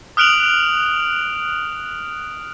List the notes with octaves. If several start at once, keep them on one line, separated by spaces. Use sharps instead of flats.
D#6 F6 F#6 D7 F7 F#7